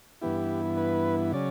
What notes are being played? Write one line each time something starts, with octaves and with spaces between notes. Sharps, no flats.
G2 E3 B3 E4 G4
B4
C#3 F#3 C#4 D5